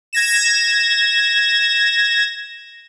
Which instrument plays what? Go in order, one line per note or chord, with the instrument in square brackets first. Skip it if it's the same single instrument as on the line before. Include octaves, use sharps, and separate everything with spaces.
[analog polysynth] G#6 A#6 E7